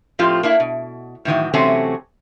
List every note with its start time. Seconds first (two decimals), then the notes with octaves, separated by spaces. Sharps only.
0.19 A2 F3 C4 F4 G4
0.43 A#3 D4 E4
0.60 B2
1.25 A2 D#3 E3 F#3
1.54 C3 E3 F#3 A3 C4 C#4